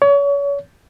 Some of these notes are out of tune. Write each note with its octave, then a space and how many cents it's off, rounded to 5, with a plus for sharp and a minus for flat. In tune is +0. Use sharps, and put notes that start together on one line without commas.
C#5 +35